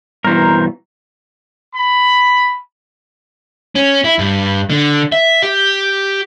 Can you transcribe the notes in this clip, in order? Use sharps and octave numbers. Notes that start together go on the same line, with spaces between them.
G2 B2 E3 A#4 C5 A#5
B5
C#4
E4
G2
D3
E5
G4